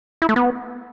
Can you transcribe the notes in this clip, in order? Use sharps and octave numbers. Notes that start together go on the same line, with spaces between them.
E4
A3
B3